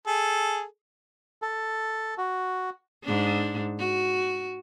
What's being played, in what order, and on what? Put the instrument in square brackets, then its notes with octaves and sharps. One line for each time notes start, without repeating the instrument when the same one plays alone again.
[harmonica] G#4 A4
[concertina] A4
F#4
[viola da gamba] G#2 D4
F#4